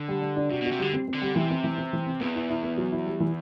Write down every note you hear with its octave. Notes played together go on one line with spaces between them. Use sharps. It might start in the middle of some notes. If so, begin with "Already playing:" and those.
Already playing: D3
G3
G3
D4
C3 F#4
B2 F#4
C3
D3 G3
C4
C4
D3
G3
C3 E3
C4
E3
C4
E3
C4
E2 B3
E4
E4
B3
F#3
E4
G3
E3